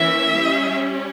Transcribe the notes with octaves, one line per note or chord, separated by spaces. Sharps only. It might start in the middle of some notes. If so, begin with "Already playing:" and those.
Already playing: E3 A#3 C#4 E5
G3 C#4